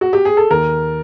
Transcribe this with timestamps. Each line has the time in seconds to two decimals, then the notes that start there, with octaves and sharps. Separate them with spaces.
0.01 F#4
0.13 G4
0.25 G#4
0.37 A4
0.50 D#2 A#4